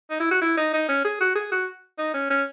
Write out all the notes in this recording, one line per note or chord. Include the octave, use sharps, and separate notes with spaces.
D#4
E4
F#4
E4
D#4
D#4
C#4
G#4
F#4
G#4
F#4
D#4
C#4
C#4